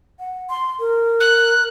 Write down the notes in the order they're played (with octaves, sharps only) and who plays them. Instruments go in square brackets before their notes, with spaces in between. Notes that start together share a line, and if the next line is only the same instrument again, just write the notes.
[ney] F#5
C6
A#4
[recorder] F#6